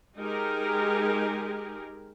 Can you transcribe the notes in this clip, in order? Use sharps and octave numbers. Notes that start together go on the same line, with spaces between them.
G#3 D#4 G4 G#4 A#4